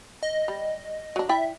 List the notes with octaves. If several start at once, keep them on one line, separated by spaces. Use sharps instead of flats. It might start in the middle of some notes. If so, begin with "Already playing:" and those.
D#5
G3
F#3 D4
E4 D5 E5 G5